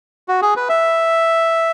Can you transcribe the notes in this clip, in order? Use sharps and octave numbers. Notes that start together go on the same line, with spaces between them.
F#4
G#4
B4
E5